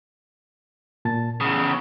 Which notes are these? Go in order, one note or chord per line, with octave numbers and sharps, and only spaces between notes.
A#2 A5 A6
E2 C#3 D#6